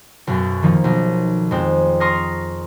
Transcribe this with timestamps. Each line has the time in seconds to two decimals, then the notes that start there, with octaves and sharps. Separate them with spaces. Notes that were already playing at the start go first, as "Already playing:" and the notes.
0.27 B1 F#2
0.63 D#3 F3 A#3
0.84 B1
1.51 F2 G#3 C4
2.00 A#5 C6 C#6 D#6 F6 A#6